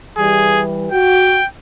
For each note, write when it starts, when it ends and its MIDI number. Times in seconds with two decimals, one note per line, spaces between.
0.18 0.87 52
0.18 0.87 55
0.18 0.62 68
0.92 1.37 66
0.92 1.47 79